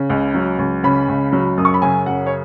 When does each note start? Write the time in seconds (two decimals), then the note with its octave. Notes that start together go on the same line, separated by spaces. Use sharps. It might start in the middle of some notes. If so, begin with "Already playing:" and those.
Already playing: C#3
0.10 C#2
0.34 F#3
0.59 C#2
0.84 C#3 B5
1.08 C#2
1.32 F#3
1.58 F#2 D#6
1.65 C#6
1.74 B5
1.82 C#3 G#5
2.06 F#2 F#5
2.27 C#5